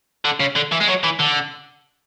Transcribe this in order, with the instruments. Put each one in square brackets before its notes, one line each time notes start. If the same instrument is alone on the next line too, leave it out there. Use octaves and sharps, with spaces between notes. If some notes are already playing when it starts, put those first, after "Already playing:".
[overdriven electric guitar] D3
C#3
D3
E3
G#3
F#3
E3
D3